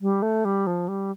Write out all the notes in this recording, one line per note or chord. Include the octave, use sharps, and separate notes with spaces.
G3
A3
G3
F3
G3